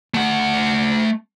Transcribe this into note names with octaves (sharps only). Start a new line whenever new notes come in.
A3 F#5